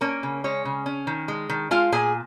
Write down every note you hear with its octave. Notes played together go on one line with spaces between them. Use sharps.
A#3 C#4 A#4
C#3
G#3 C#4 C#5
C#3
C#4
D#3
G#3
D#3
G#3 F4 F5
A#2 G#4 G#5